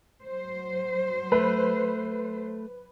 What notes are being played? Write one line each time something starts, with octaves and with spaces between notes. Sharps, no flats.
F#3 C5
A3 B4